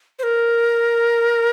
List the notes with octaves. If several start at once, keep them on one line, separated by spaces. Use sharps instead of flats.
C5
A#4